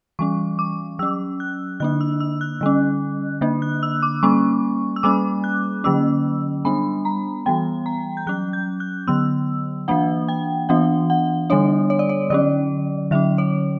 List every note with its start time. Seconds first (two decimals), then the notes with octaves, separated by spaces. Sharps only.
0.19 E3 G3 C#4 C#6
0.59 D6
0.99 F#3 C#4 E6
1.40 F#6
1.80 D3 A#3 D4 F#6
2.01 E6
2.20 E6
2.41 F#6
2.61 D3 G3 C#4
3.41 D3 A#3 D4
3.62 F#6
3.83 E6
4.03 D6
4.23 G3 A#3 C#4 C#6
4.96 E6
5.03 G3 A#3 C#4 D6
5.44 F#6
5.84 D3 F#3 A#3 C#4 E6
6.65 G3 B3 D4 B5
7.05 A#5
7.46 E3 G3 B3 G5
7.86 A#5
8.17 G6
8.27 F#3 C#4 F#6
8.53 G6
8.80 F#6
9.07 D3 F#3 B3 E6
9.88 E3 A#3 D4 F#5
10.28 G5
10.69 E3 B3 D4 F#5
11.10 F#5
11.50 D3 G3 B3 D4 C#5
11.90 C#5
11.99 D5
12.09 C#5
12.30 D3 F#3 C#4 D5
13.11 D3 F#3 C#4 E5
13.38 C#5